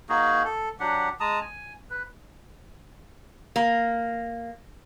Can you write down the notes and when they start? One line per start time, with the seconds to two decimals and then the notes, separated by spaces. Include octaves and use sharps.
0.09 A#3 D#4 F#4 G#4
0.45 A4
0.80 F#3 D4 G4 F#5
1.20 G#3 A5 A#5 D#6
1.41 G#5
1.90 B4
3.56 A#3